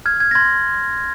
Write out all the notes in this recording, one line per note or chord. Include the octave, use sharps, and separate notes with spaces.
F6 G#6
G#6
A#6
C6 G#6